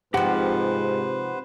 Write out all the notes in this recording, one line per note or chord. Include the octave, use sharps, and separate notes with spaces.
G#2 C3 F3 G4 B4 C5 F#5